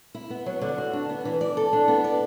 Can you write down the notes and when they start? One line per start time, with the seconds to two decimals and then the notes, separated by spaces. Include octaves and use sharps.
0.15 E4
0.30 B3
0.46 F#3
0.61 D3
0.78 F#4
0.93 D4
1.09 B3
1.25 E3
1.41 D5
1.57 A4
1.73 D4
1.88 B3
2.04 D5